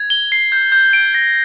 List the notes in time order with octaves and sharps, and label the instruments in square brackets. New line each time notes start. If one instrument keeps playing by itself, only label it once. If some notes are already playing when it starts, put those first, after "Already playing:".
Already playing: [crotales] G#6
G7
C7
G6
G6
D7
A#6